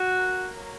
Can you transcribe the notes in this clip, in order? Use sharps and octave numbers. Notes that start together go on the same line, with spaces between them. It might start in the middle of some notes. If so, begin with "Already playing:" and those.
Already playing: F#4
A#3
F#3